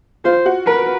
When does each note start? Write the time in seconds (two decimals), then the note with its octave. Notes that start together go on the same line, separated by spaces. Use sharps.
0.25 F4 C5
0.46 F#4
0.66 A#4 B4